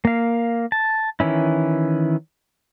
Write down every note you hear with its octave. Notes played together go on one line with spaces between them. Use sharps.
A#3 F5
A5
D#3 E3 C#4 E4